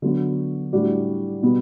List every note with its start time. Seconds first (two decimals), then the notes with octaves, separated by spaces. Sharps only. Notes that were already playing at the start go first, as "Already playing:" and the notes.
0.02 D3 F#3 B3 F#4
0.73 A2 G3 D4 F#4
1.43 B2 G3 B3